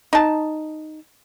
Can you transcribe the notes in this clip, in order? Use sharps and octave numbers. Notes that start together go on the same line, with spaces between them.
D#4 A5